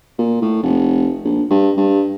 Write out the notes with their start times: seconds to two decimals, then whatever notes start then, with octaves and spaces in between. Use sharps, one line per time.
0.18 A#2
0.41 A2
0.63 F1
1.25 A#1
1.50 G2
1.77 G2